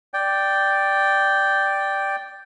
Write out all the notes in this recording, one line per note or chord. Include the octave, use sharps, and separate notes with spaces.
D5 G5